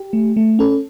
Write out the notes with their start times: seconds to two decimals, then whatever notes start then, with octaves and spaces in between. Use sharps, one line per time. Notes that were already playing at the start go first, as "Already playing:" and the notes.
Already playing: G4
0.13 A3
0.37 A3
0.59 C#4 A4